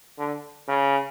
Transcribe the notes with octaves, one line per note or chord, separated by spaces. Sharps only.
D3
C#3